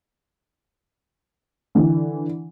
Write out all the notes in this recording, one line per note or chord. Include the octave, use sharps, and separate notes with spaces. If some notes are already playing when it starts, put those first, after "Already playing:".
D3 E3